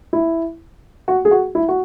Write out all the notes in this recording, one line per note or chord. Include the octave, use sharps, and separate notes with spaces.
E4
F#4
G#4
F#4
E4
F#4